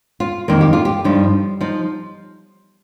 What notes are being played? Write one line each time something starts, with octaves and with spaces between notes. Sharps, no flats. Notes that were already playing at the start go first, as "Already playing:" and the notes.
F4
F2 D#3 A#3 D#4 A#4
G4
F4
G4
G2 F3 D#4
F3 D#4